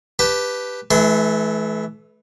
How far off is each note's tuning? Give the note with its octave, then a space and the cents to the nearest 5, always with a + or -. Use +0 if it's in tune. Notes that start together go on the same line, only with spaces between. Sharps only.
G4 +0 B4 +0 A5 +0
E3 +0 A3 -40 C6 -40